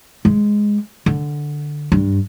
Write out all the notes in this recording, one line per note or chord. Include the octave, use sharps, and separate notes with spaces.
G#3
D3
G2